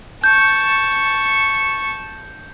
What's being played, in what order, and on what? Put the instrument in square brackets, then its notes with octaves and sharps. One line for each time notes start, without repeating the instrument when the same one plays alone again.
[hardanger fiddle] A5 C#6 [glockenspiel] G6